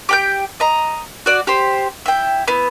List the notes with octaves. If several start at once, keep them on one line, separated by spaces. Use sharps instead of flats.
G4 G5 G6
D#5 A#5
F#4 D5
G4 C5
E4 G5
B3 E4